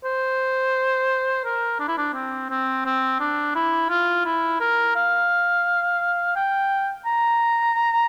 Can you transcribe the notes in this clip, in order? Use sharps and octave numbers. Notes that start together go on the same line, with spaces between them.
C5
A#4
D4
E4
D4
C4
C4
C4
D4
E4
F4
E4
A#4
F5
G5
A#5